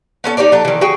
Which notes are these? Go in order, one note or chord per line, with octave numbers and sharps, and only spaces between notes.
B3 C#4 A4
D#4 G4 C#5 D5
F#3 A4
D#3 E3
F#4 G#4 G5